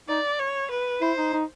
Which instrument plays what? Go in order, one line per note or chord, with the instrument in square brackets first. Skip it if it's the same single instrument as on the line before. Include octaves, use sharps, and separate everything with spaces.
[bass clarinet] D#4 [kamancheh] D5
[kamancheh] C#5
B4
[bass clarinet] E4 [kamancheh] C5
[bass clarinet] D#4
D#4